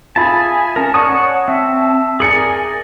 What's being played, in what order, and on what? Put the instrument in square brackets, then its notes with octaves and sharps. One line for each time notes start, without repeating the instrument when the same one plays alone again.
[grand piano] F4 B5 [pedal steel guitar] G#4 E5 A5 [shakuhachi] G#5
[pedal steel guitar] C#4 A#4 [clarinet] A5
[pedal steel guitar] C#5 F#5 A5 [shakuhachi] D5 [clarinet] C#6 [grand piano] D#6
[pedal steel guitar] C4 [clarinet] E5 [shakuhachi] A5
[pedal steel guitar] G#4 A#4 D5 [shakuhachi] G#5 [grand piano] C#7 F#7